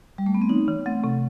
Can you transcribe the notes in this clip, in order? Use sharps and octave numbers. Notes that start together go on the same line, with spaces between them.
G3
A3
B3
C4
E3 D#4
E3
A3 C4
C3